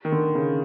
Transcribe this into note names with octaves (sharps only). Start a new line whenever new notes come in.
D#3
D3
C#3